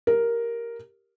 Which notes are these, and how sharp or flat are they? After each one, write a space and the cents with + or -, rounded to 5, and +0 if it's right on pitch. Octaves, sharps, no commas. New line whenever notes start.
G4 +0 A#4 +0